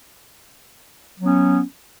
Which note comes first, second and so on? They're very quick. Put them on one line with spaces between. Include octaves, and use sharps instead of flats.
F#3 C#4 B3